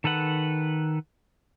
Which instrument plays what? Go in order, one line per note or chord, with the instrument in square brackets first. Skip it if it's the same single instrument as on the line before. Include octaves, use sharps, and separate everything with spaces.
[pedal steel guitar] D#3 A4 B4 F#5